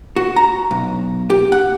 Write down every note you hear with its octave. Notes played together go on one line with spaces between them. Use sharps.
F#4
A#5
B1
G4
F#5